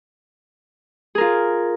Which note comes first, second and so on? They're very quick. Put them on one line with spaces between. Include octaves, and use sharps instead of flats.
G#4 A#4 F4